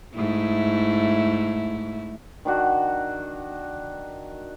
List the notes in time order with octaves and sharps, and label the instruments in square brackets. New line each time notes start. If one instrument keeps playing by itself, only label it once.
[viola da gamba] G#2 A3 E4
[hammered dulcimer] D#3 D4 F#4